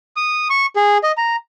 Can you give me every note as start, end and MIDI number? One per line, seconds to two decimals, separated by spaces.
0.16 0.48 87
0.50 0.66 85
0.76 0.98 68
1.03 1.12 75
1.17 1.36 82